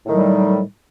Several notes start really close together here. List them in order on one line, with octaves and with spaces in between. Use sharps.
A2 D#3 F#3 G3